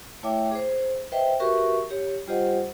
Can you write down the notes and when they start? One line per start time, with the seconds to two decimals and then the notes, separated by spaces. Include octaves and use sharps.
0.23 A3 E4 C#5 E5 G5 D6
0.52 G#4 C5
1.12 B4 C5 D#5 E5 G5
1.40 F#4 G4 A#4 B4 E5 C#6
1.90 G4 C#5
2.27 G3 F4 G4 C5 D#5 F#5